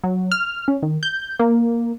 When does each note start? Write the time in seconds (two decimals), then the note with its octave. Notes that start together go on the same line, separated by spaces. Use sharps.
0.04 F#3
0.32 F6
0.68 C#4
0.83 D#3
1.03 G6
1.39 A#3